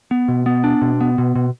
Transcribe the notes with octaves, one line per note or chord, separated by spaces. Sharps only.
B3
B2
B3
D4
B2
B3
B2
B2